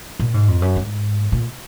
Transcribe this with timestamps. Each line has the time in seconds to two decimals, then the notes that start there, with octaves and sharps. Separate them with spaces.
0.20 A#2
0.34 G#2
0.48 F2
0.62 F#2
0.76 G#2
1.32 A#2